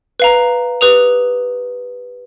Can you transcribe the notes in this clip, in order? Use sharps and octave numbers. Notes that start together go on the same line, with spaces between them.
B4 F5 A#5
G4 B4 D#6 F7